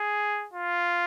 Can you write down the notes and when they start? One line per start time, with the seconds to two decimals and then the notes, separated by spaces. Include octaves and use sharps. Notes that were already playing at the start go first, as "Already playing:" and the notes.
Already playing: G#4
0.53 F4